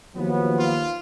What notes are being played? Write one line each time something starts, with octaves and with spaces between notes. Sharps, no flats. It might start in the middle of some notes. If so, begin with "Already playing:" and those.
D#2 F3 F#3 B3
F4